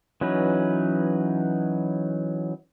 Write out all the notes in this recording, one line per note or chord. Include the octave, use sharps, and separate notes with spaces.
E3 F#3 C#4 D#4 B4